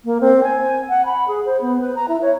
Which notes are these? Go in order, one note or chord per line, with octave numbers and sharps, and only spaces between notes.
A#3
C4
G#5
F#5
B5
G#4
C5
B3
B4
A#5
E4
C#5